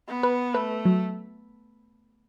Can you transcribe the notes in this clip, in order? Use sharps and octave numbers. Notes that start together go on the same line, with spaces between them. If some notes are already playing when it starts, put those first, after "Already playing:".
B3
B4
A3 B4
F#3